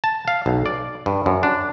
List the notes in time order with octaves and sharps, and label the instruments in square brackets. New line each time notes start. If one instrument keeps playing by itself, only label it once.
[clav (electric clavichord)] A5
F5
B1
D5
G2
F#2
D4